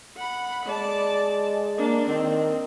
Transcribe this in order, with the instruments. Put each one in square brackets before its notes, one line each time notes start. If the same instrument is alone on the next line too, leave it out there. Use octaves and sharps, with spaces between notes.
[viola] F#5 B5
[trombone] G#3 [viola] D5 A5
[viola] A#3 D4
[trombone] D#3 [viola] C4